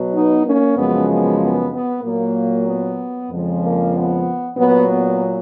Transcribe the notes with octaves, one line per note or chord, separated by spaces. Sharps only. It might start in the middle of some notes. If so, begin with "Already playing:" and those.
Already playing: B2 F#3
B3 D#4
A#3 C#4
F#2 C#3 F3 G#3 B3
B3
B3
B3
A#2 F#3 A#3
B3
F2 C#3 F3 G#3
A#3
B3
A#2 F#3 B3
B3